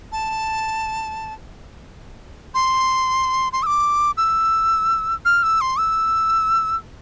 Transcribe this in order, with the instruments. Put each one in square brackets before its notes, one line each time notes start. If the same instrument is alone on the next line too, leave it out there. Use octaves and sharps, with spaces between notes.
[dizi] A5
C6
C6
E6
D6
E6
F6
E6
C6
E6